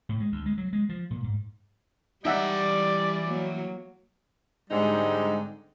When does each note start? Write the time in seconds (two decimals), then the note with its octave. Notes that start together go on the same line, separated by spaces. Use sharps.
0.09 A2
0.20 G#3
0.32 D2
0.46 G#3
0.58 F#3
0.73 G#3
0.89 F3
1.11 A#2
1.24 G#2
2.25 E3 G3 D#4 D5 E5 F#5 G5
3.26 F#3 A#3
4.70 G#2 D3 G3 G#3 C4 D#4